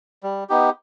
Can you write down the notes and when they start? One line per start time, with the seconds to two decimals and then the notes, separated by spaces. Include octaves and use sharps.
0.23 G3
0.50 B3 D#4 G4